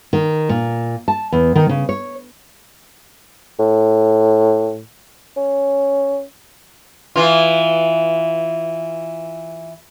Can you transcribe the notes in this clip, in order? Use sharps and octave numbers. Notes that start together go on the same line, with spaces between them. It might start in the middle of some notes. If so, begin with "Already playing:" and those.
D#3
A#2
A5
E2
D#3
C#3
C#5
A2
C#4
E3 F4